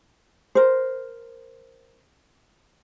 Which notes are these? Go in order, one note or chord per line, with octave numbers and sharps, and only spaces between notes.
A#4 C5